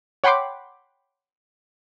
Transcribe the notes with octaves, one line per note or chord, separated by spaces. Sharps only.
C#5 F#5 G5 B5 C6 D6